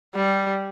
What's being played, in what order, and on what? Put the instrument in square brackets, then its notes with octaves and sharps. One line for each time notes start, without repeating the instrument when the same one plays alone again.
[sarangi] G3